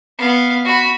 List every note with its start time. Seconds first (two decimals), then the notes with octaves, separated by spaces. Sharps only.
0.19 B3 F5
0.65 F#4 B5